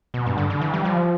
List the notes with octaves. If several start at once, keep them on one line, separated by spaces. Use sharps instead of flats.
B2
G2
D3
D3
E3
G3
F3